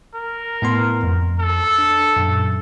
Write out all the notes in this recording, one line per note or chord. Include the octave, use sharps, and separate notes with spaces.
A#4
A2 B3 C6
F2
A4
D4
F#2 A#2